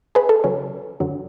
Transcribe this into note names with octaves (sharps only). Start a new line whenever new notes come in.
G#4 B4
A4
C#3 F#3 C#4
F#2 D3 F#3